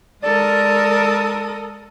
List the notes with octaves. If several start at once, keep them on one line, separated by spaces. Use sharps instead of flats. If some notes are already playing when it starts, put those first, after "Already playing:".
G#3 A4 A#4 D5 D#6